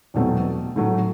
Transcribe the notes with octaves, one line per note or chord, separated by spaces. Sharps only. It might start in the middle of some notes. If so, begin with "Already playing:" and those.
E2 B2 F#3 A3 C4
A2 F#3 A3